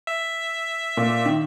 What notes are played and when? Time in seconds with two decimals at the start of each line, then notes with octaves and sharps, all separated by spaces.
0.07 E5
0.97 A#2
1.25 D#3